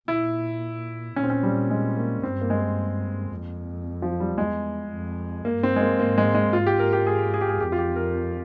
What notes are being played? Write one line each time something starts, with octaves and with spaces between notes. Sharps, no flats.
A#2 E4
A#2 C#4
C4
C#4
G3
G#3
A#3
G2 C4
A#3
G#3
A#3
F2
F3
G3
E2 G#3
F2
G2 A#3
C4
G#3
A#3
G#2 A#3
G#3
G#3
G#2 F4
G4
A#4
G4
G#4
G#4
G4
G#4
F2 G4
F4
G4
A#4